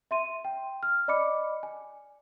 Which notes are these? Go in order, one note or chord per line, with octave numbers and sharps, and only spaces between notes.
E5 C6 D#7
G5
F6
D5 D#5 B5 D6 C#7
G#5